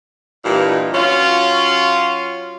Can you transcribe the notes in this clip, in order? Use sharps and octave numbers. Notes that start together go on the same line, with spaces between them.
G2 A#2 E3 D#4
F#3 C#4 F4